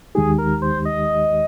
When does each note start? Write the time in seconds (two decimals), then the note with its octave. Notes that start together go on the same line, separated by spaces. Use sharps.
0.15 D#2 D#3 G#3 D#4 G4 G#4
0.38 A#4
0.62 C5
0.85 D#5